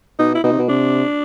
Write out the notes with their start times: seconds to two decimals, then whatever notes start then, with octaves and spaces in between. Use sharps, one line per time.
0.19 B2 D#4
0.35 E4
0.44 B2 D#4
0.51 C3
0.59 B2
0.69 C3 D4